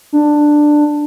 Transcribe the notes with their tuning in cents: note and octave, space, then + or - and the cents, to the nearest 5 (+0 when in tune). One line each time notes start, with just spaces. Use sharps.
D4 +10